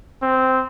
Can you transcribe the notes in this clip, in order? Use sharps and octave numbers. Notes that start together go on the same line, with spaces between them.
C4